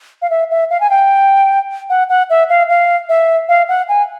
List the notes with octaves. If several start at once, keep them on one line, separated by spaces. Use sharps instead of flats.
F5
E5
E5
F5
G#5
G5
F#5
F#5
E5
F5
F5
E5
F5
F#5
G#5